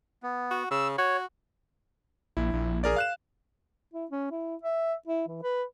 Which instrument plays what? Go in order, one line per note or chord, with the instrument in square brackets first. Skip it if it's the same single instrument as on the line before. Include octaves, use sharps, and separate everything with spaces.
[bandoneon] B3
[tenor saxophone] F#4
[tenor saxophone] C#3 [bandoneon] E6
[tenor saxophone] F#4 [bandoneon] C#5
[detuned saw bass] A#1 [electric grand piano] E4
[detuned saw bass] A#1
[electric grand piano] G#4 A#4 D5
F5 F#6 E7
[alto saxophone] E4
C#4
E4
E5
E4
E3
B4